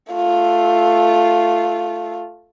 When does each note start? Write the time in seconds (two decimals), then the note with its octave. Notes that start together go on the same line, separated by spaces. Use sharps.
0.13 A3 F4